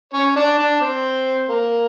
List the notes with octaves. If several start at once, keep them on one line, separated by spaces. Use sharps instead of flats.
C#4 C#5
D4 D5
D4 D5
C4 C5
A#3 A#4